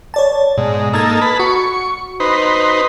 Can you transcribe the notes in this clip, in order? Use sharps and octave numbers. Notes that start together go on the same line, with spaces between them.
C#5 D5 A5
G#2 B2
A#3 D#4 A4 E6 G#6
B4 A5 B5
F#4 C#6
D#4 B4 C5